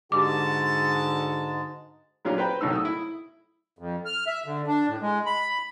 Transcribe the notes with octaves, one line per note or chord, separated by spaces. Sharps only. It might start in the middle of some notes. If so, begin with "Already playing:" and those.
G#2 D3 G#3 F#4 G4 A5 D6
A#2 F#3 C#4 D4 F4 G4
B4 C5 G5 A#5 B5
C2 A2 F#3 D#4 E6
D#6 E6
E4
F2
F6
E5
D3
D4
A2
G#3
B5